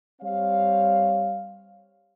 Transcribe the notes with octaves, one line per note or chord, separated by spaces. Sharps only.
G3 C4 C#5 F5